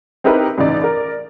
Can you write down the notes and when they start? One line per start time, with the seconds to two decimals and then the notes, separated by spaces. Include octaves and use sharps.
0.24 C4 D#4 E4 G4 A#4 B4
0.58 C#2 A2 E3 D#4 D5
0.82 A#4 D5